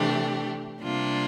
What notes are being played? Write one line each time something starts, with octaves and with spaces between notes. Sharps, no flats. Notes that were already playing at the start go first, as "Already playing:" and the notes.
Already playing: C3 E3 A3 D4 G4
C3 G3 A#3 D4 F4